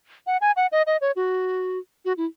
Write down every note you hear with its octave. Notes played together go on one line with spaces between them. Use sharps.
F#5
G#5
F#5
D#5
D#5
C#5
F#4
F#4
E4